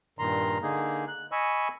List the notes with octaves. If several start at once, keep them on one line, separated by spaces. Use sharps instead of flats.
G2 A#2 D#3 A#5 C6
D3 A#3 D#4 G#4
F#6
D#5 G#5 B5 C#6 E6